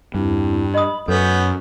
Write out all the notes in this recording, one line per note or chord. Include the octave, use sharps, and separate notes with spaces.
E2 G2 C4 E4
D#5 B5 D#6
F#2 B3 C#4 A4 G6